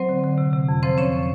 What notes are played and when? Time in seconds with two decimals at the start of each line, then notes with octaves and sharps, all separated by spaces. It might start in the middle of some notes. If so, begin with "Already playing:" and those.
Already playing: F#3 C4 C5
0.09 D3
0.24 D3
0.38 C3
0.53 C3
0.68 F2
0.83 F3 C4 C5
0.98 F3 C#4 C#5